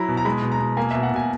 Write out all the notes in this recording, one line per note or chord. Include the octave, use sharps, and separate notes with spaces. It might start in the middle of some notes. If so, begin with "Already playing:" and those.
Already playing: F#3 E4 A#5 B5
B2
A#5
G#3 B5
B2
A#5
B2
A#3 G#5
B2 E5
F#5
B2 G#5